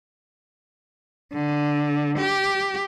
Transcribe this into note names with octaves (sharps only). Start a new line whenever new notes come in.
D3
G4